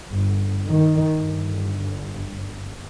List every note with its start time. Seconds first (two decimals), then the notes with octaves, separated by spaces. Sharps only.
0.12 G1
0.69 D#3
1.17 G1